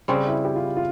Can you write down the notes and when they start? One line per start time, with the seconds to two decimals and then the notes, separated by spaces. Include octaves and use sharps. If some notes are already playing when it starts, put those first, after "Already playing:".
0.08 C#3 G3 C4 C#4
0.27 E4
0.45 G4
0.56 F4
0.66 E4
0.76 F4